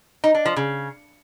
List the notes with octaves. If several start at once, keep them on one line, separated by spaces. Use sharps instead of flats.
D#4
D4
F3
C#3